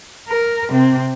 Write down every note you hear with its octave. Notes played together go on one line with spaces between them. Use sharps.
A#4
C3 C4